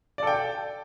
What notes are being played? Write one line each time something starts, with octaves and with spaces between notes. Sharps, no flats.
A4 D5 G5